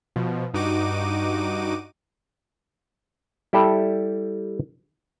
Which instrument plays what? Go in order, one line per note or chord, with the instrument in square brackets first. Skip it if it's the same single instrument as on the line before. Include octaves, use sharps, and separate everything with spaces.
[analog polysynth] B2 F3
G2 D#4 F#4 D6 D#7
[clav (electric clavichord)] G3 E4 G4 A4